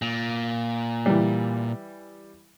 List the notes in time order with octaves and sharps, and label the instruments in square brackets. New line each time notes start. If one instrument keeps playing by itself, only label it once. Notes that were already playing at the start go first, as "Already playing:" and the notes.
[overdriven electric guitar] A#2
[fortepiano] E3 G3